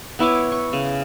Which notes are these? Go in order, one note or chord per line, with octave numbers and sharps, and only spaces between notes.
B3 E4 C#5 D6
C#6
C#3